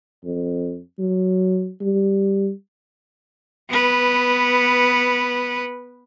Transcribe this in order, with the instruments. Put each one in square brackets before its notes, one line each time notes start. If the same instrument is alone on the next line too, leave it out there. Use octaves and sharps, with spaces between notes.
[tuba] F2
F#3
G3
[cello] B3 B4